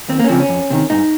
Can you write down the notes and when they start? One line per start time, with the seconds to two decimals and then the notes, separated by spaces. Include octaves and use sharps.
0.08 D#2 C4
0.20 A#3
0.24 C#4
0.29 C#3 F3 C4
0.40 C#4
0.49 F2
0.70 C3 D#3
0.90 G2 D#4